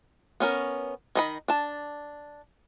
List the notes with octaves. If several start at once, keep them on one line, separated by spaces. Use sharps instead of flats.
B3 C#4 A#4
D#3 D#5 B5
D4 A5